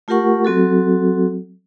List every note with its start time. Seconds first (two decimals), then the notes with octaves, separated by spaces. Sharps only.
0.08 A3 F4 G4 A#4 F#5 C#6
0.45 F#3 C4 F#4 A4